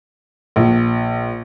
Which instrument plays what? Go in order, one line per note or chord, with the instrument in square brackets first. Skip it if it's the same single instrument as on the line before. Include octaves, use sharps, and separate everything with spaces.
[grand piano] A#1